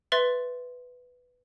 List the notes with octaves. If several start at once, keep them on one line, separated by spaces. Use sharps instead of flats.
B4 E5 C6 A6